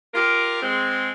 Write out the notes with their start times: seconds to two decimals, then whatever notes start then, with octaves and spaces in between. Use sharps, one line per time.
0.14 F4 G4 A#4
0.62 G#3 C4